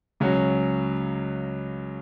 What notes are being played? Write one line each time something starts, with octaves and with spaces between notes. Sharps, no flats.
C#2 C#3 F#3 C#4 F#4